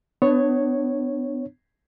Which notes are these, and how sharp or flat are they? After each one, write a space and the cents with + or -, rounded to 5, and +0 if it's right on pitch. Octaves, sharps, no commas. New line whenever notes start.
B3 +30 D4 +20 C#5 -5